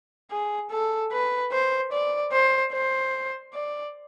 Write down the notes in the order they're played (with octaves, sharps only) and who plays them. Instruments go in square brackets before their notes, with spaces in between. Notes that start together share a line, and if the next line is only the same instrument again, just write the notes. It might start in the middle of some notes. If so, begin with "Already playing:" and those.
[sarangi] G#4
A4
B4
C5
D5
C5
C5
D5